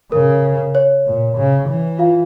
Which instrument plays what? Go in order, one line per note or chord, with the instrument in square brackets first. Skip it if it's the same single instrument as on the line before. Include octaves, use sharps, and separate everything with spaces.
[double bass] C#3 [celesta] A#4
[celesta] C#5
[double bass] A#2
C#3
E3
[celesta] F4 F5